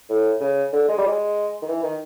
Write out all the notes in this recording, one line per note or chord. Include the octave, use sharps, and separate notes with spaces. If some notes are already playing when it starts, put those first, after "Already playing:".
A2
C#3
D3
G#3
G3
G#3
D#3
E3
D#3